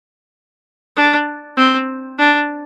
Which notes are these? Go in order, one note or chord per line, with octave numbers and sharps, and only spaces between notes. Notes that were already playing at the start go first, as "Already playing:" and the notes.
D4
C4
D4